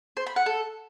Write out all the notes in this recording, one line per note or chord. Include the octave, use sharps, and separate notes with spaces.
C5
B5
F#5
A4